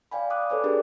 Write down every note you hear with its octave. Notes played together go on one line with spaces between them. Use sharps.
D5 F5 G5 G#5 B5
D6 D#6 F#6
A4 B4 C#5 D5 G#5
D4 G4 G#4 A#4 B4 D5